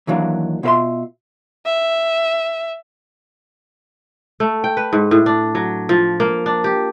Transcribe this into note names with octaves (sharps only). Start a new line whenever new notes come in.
D#2 E3 F#3 D4 F5
B2 F4 A#4 E5 C6
E5
A3
G5
B4
G#2
A2
D4
F#3
F3
A#3
D4
G4